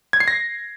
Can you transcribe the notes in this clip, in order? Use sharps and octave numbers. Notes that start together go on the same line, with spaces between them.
G#6
C7
A#6